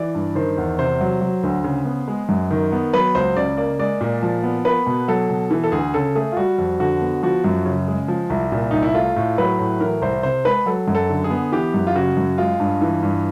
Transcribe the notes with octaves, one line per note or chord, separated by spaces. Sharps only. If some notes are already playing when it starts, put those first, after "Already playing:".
Already playing: E3 D5
G2
D#3 C5
E2
C3 C5
F#3
F#3
D2
C#3
B3
G#3
F#2
D#3
B3
F#3 B4
C#2 C5
C#3 D5
A#3 D5
G#3 D5
A#2
F3
B3
A#3 B4
B2
F#3 A4
B2
E3
A4
D2 G#4
C#3 A4
A3 G#4
F4
G3 F#4
F2
D3 F#4
B3
F3 F#4
F#2
C#3
G#3
F3
C2
A#2
C2 D#4
E4
A3 F4
A2
F#3 B4
A2
E3 A#4
C2 C5
C3 C5
G#3 B4
F#3 A4
F#2
A4
D3
G#4
B3
E3 G4
F#2
F4
C#3 F#4
F#2
G#3 F4
G2
E3
G2